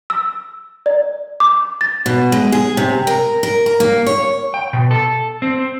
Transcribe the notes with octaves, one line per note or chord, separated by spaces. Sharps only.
E6
D5
D6
A6
B2
G#3
G#4
C3
A#4
A#4
A#4
A#3
C#5
G5
B2
A4
C4